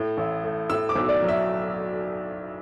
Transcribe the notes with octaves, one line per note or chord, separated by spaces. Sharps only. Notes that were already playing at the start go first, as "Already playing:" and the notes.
Already playing: A2
A1
A3
A2 E6
D6
B1
D5
F#3
E5